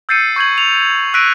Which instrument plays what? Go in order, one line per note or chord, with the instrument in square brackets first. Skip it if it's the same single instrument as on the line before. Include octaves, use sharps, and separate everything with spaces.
[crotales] E6 G6 A6 C7 C#7 D#7
C#6 G6 G#6 F#7
F7
E6 F#6 A#6 B6 D7 D#7